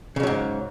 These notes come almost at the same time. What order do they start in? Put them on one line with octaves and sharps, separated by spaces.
C#3 F2 F#3 G#2